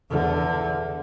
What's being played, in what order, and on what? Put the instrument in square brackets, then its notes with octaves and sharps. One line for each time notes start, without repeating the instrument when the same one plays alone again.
[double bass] E2 D3